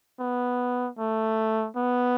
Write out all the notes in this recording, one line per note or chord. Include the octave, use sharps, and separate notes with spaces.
B3
A3
B3